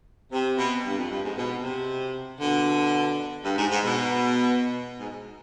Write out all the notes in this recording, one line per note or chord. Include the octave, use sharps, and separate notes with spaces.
C3
B2
G2
F2
G2
G#2
B2
C3
B2 D3
G2
G#2
G#2
B2
G#2